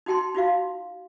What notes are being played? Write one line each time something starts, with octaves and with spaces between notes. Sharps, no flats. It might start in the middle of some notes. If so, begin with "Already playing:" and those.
D#4 F#4 G5 A5 C6
D#4 F4 F#4 F5